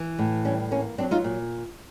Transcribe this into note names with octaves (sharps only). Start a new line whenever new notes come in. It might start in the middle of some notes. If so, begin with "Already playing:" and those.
Already playing: E3
A2
G3 C#4
A#3 C#4
F#3 C4 D4
D#4 F4
A#2